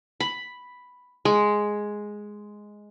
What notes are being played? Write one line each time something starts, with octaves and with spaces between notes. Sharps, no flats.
B5
G#3